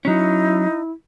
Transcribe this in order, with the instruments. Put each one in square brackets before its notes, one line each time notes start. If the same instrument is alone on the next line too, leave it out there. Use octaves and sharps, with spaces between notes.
[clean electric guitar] F#3 C#4 [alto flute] D#4 [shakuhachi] E4